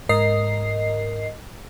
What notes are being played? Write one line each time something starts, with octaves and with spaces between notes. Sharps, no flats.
G#2 A#4 D#5 C7